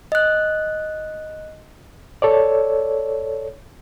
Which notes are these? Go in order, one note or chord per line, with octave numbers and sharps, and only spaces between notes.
D#5 F#6
A4 C#5 D5